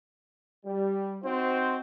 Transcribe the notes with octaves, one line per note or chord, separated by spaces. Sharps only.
G3
C4 D#4 F#4 C5